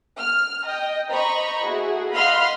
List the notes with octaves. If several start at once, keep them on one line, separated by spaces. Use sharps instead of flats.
F6
D#5 G5
C5 D#5 A#5 B5 C#6
A3 E4 F#4 G#4
D#5 F5 F#5 B5 C6 F6